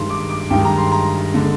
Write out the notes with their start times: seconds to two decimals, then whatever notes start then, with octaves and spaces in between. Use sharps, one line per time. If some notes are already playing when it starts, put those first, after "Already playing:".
Already playing: G2 D#3 G#3 C6
0.10 D6
0.30 D6
0.50 G2 D#3 G#3 G5
0.64 A#5
0.77 C6
0.92 A#5
1.34 D3 G#3